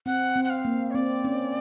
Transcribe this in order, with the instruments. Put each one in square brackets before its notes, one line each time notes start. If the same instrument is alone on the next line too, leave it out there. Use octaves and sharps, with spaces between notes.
[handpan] C4 [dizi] F#5
[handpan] C4
[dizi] F#5
F5
[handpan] A#3
[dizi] C#5
[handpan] C4 [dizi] D5
[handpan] C#4